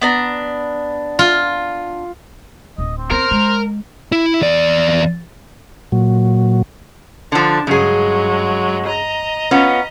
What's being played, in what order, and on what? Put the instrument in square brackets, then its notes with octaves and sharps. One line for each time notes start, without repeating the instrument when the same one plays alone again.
[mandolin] B3 D4 A#5
[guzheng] F4
[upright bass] D1 [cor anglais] D#5
[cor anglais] C4
[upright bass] C4 [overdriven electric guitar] A#4 [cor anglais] C5
[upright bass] G#3
[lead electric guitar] E4
E2 D5
[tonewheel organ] A#2 F#3
[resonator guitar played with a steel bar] D3 F3 [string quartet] D4
[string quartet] G2 F#3 G#3 [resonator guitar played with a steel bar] C#3 G#4
[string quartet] D#5 A#5
[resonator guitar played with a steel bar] B3 C#4 F4